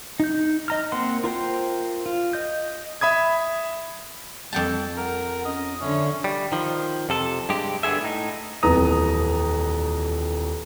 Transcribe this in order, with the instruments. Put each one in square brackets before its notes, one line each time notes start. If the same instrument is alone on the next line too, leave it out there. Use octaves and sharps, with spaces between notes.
[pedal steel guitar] D#4 G6
D#5 A#5 F6
A#3 C4 F#5 C6
F4 A#4 C5 G5
F4
D#5 G6
[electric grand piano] E5 B5 D#6 G#6
[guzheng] F2 G5 A5 [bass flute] G3
[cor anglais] A#4 [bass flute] F#5
[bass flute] C#4 [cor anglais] D#5
[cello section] D3 [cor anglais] C#4 [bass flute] E5
[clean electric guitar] G3
D#3 F3
F2 C3 A4
G2 G#3 G4
G2 D3 B3 G#4 E5
A2 D#4
[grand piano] D#1 F2 E3 B3 A#5 D#6